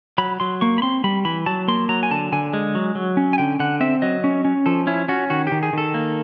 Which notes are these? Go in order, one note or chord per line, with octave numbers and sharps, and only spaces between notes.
F#3 B5
F#3 C6
A#3 C#6
B5
C4 C6
G3 B5
E3 B5
F#3 A5
A#3 C6
F#3 A#5
G#5
D3 A5
D3 G#5
G#3
F#3
F#3
C#4
G#5
D3 G5
D3 F#5
C4 E5
F#3 D#5
C#4
C#4
F3 A4
C#4 E4
C#4 F#4
D#3 F#4
D#3 G4
G#4
D#3 A4
A#3